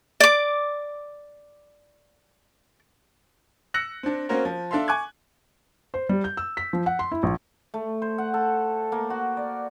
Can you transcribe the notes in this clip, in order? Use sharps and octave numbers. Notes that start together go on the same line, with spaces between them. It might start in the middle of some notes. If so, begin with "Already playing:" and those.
D5 D6
E6 F#6 A#6 C#7 F#7
C4 D4
A#3 C4 C#4 F#4 A#4 C5
F3
D4 A4 E5 F5 C6
G#5 C#6 D6 F#6 G#6
C5
G3
G6
E6
B6
F3
F#5
C6
E4
A#1
A3
C5
F#5
A4
A#3
F#4
D5